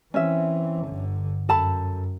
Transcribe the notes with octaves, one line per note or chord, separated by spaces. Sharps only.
E3 C4 C#4 E5
G1 D3
F#2 A4 A5 B5